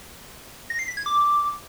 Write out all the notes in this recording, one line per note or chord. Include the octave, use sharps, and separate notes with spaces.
A#6
C7
B6
G#6
D6